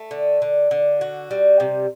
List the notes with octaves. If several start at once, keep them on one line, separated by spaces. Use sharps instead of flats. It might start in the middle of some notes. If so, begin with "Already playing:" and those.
Already playing: A3
D3
D3
D3
F#4
G3
C3